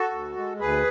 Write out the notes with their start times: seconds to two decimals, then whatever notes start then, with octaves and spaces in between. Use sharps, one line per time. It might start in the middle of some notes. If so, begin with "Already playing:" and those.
Already playing: F#4 A4
0.11 D2
0.37 G#3
0.60 D2 G#4 B4